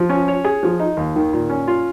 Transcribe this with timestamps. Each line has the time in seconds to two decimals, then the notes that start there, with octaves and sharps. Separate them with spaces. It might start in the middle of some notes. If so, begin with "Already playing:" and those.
Already playing: F3
0.10 C#4
0.28 C#5
0.45 G#4
0.63 F3
0.80 D#4
0.97 D#2
1.16 D#3
1.33 A#2
1.50 C#4
1.68 F4